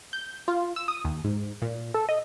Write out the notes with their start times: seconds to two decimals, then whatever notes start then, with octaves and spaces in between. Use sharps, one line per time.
0.13 G6
0.48 F4
0.76 E6
0.88 D#6
1.05 D#2
1.24 G#2
1.62 A#2
1.94 A4
2.09 D#5